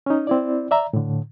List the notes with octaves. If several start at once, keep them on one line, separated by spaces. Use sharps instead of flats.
C#4 D#4
C4 E4 D5
D5 E5 A#5
A2 D3